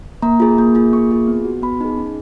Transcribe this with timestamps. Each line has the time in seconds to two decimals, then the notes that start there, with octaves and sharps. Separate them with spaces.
0.22 A#3 A#5
0.40 F4 G#4
0.58 A#3
0.75 F4 G#4
0.93 A#3 C#6
1.11 F4 G#4
1.28 B3
1.45 F#4
1.62 B3 B5
1.81 D#4 G#4
1.97 C#4